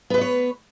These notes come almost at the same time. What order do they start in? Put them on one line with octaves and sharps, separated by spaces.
B3 B4 D#5 C#5